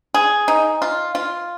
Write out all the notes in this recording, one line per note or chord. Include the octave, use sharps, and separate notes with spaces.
G#4
D#4
F4
F4